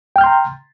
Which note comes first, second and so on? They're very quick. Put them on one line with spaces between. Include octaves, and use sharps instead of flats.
G5 F6 G6 C6 A#5